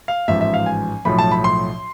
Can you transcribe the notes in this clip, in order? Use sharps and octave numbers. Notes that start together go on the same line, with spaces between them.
F5
A1 G#2 F3 E5
E5
F5
G#5
B1 A2 F3 B5
A5
B5
C6